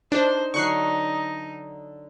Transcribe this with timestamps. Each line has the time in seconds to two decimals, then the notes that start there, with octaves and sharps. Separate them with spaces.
0.12 D4 D#4 C5
0.54 D3 F#3 D#4 C#6 F#6 C7